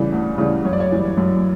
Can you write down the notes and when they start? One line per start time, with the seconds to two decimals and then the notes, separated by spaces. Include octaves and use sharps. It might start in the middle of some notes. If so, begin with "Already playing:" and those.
Already playing: C#3 E3 G3
0.12 D2
0.38 C#3 E3 G3
0.65 F#2 C#5
0.73 D5
0.80 C#5
0.92 E3 G3
1.17 F#2